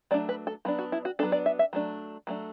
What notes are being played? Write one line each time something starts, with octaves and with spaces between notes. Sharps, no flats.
F#3 A3 D4 D5
B4
A4
F#3 B3 D4 F#4
F#4
E4
F#4
F#3 B3 D4 A4
D5
E5
E5
F#3 A3 D4
F#3 A3 D4